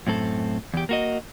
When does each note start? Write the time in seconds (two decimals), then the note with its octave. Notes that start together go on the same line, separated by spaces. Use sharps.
0.07 F#2 A2 C4 A4
0.74 E2 G4
0.89 A#3 F#4 D#5